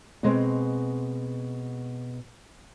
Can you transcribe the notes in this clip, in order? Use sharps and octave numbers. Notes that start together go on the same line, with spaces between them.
B2 G#3 C4